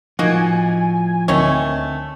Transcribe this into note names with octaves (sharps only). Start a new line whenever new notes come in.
A2 F3 A#3 D#4 F#4 G#5
D2 D3 D#3 A3 C4 C#5